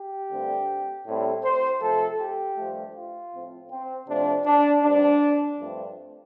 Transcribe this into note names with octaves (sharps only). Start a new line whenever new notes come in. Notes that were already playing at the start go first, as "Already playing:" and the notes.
Already playing: G4
G2 D3 A3 C4
A2 G3 C4
C5
C3 F3 A3 A4
G4
G2 F3 A3
F4
A2 F3 C4
C4
F2 C3 F3 A3 C4 D4
D4
G2 G3 C4 D4
G2 F3 A3 C4